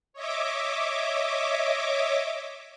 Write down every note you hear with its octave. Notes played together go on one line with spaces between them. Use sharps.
C#5 D#5 E5 D6